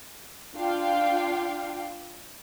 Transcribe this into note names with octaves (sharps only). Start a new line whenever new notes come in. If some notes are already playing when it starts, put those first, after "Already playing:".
D4 F4 F5 G5